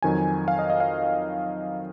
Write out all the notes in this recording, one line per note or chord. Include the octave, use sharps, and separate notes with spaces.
F2 D#3 F#3 G#5
F5
D#5
D#5
F5